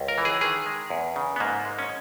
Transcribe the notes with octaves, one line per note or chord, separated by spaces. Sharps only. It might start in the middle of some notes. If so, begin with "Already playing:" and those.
Already playing: C#2
A#4
E3
G#4
D#3 G#4
G#3
E2
C#3
B3
G#2 A#3
G#3
C#4